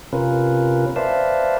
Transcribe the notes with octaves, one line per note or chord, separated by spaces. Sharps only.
C3 C#4 F4 A#4 B4
B4 C5 D5 E5 F5 A5